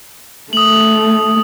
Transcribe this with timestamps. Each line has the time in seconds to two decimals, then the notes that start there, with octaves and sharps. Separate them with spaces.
0.53 A3 D#6 F#7